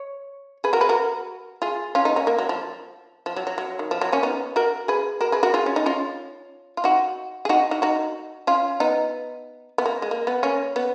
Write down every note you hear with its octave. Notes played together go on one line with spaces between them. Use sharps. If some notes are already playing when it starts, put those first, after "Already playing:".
Already playing: C#5
G#4 B4
F#4 A#4
G#4 B4
F#4 A#4
F4 G#4
C#4 F4
B3 D#4
A#3 C#4
A#3
F#3
F3
F3
F#3
F#3
F#3
D#3
F3
F#3
A#3 C#4
B3 D#4
F#4 A#4
G#4 B4
F#4 A#4
G#4 B4
F#4 A#4
F4 G#4
C#4
D#4
C#4 F4
F4
D#4 F#4
G#4
D#4 F#4
D#4 F#4
D#4 F#4
C#4 F4
B3 D#4
B3
A#3
G#3
A#3
B3
A#3 C#4
B3